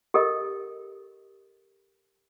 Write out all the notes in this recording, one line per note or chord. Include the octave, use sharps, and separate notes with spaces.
G4 A4 A#4 D#5